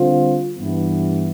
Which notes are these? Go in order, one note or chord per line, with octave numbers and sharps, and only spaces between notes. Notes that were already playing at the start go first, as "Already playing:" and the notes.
Already playing: D3 G3 C4 F4
G2 E3 B3